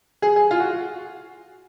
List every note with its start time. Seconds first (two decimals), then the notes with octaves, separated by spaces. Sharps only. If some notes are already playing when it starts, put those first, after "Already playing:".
0.22 G#4
0.36 G#4
0.51 F4
0.60 F#4